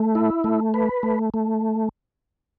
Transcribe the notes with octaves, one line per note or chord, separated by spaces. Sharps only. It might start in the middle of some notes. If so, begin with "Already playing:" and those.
Already playing: A3
E4
A3
B4
A3
A3